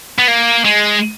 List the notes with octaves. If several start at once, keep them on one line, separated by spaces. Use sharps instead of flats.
B3
A#3
G#3